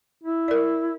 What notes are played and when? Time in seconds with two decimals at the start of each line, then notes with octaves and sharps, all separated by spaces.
0.24 E4
0.48 A#4 D5